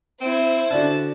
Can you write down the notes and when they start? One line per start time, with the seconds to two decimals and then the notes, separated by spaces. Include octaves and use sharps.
0.21 C4 E4 C5
0.71 D3 D4 F#4 A5